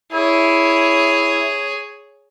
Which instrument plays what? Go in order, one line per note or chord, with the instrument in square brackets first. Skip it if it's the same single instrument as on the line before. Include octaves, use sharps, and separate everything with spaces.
[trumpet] E4 [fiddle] G#4 C#5